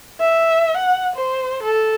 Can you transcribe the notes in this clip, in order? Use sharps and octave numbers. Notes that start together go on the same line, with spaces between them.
E5
F#5
C5
A4